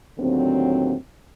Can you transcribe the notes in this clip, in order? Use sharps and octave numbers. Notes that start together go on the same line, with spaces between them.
D#2 A2 D3 F#3 C4